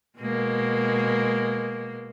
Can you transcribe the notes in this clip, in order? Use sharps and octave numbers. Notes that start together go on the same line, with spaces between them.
B2 G#3 A#3